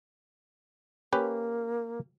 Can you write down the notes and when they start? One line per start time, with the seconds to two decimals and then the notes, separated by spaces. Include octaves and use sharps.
1.13 A#3 C#4 G4 B4